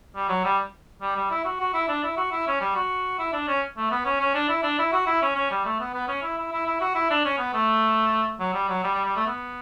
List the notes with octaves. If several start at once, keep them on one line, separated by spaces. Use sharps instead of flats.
G3
F#3
G3
G3
G3
E4
F#4
F#4
E4
D4
E4
F#4
E4
C#4
G3
F#4
E4
D4
C#4
A3
B3
C#4
C#4
D4
E4
D4
E4
F#4
E4
C#4
C#4
G3
A3
B3
B3
C#4
E4
E4
E4
E4
F#4
E4
D4
C#4
B3
A3
F#3
G3
F#3
G3
G3
G3
A3
B3